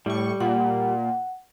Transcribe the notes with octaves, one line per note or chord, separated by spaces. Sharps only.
A2 G3 C#6
A#2 F#5